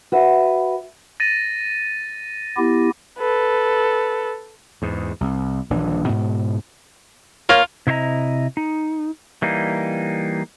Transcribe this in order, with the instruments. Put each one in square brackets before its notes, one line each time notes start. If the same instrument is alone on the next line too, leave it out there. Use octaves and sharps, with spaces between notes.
[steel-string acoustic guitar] F#4 B4 E5
[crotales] A6 A#6 D#7
[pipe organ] B3 E4 G4
[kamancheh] A4 B4
[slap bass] E2 G#2
C2
D#1 A#1 E3 D4
G#2 B2
[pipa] A#3 C#5 [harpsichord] F4
[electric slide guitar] C3 E4 C5 D#5 A#5
D#4
E3 G3 A#3 D#4